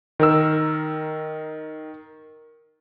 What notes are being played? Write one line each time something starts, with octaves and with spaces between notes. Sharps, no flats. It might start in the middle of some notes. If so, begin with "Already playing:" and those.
D#3 A#4 E6